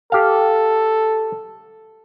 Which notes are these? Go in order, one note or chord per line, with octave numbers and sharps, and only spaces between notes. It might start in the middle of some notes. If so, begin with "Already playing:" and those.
G4 A4 F5